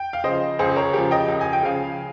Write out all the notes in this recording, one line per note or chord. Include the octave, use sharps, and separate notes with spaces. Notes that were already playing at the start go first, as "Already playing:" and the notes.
Already playing: G5
F5
C#3 F3 C5 D#5
C#2 G#4 C5
A#4 C#5
C#3 F3 G4 A#4
D#5 G5
C#2
G#5
G5
C#3 F3 F5 G#5